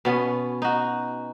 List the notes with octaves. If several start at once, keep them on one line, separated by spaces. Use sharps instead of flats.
B2 B3 C#4
D#4 F#4